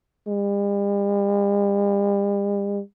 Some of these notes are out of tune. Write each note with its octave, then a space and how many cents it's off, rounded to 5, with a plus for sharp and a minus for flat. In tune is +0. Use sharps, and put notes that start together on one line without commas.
G3 +45